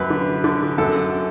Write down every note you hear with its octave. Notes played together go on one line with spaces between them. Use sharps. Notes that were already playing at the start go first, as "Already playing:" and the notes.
Already playing: F#2 B4
D3
D3
F#2 A4